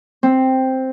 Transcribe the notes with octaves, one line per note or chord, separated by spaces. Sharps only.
C4